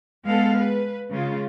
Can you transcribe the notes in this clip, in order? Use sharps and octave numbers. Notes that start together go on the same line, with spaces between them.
G#3 B3 A4 F5
B4
C#3 G#3 F4